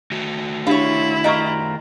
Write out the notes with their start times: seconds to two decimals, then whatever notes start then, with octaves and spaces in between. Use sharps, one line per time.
0.11 D#3 A3 F#4
0.67 D4 E4 F4 G4 C#5
1.24 F4 G4 A#4 D#5 C#6